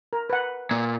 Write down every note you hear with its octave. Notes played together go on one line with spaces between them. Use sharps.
A#4
B4 F#5
A#2